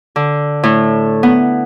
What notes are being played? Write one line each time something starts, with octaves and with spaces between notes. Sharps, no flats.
D3
A2
B3